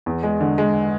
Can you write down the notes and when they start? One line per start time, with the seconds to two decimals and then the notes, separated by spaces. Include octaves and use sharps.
0.06 E2
0.23 G#3
0.41 D3
0.58 G#3